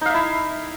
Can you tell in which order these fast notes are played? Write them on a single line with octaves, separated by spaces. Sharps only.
D#4 F5 E5 E4